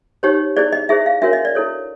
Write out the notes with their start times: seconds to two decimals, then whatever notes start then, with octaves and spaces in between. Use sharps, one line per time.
0.23 D#4 G4 C5 C#5
0.57 E4 G#4 C5 D5
0.72 D#5
0.89 E4 G#4 C5 E5
1.06 F5
1.22 D4 F#4 A#4 C#5 E5
1.33 D#5
1.45 D5
1.55 E4 A4 C#5